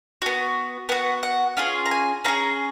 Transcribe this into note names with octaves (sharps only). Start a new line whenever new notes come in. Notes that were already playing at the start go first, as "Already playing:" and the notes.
B3 F#4
B3 F#4 F#5
F#5
C#4 F4 G#4 F5
A#5
G#5
C#4 F4 G#4 A#5